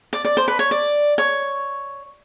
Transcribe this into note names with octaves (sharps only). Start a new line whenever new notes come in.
D5
D5
C5
B4
C#5
D5
C#5